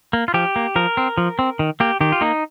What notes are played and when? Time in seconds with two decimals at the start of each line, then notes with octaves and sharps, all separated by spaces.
0.13 A#3
0.28 F4
0.34 F3 G4
0.56 A#3
0.76 F3 A#4
0.97 C4
1.18 F3
1.39 C4
1.59 D#3
1.80 A#3 G4
2.01 D#3 G4
2.12 F4
2.21 A#3 D#4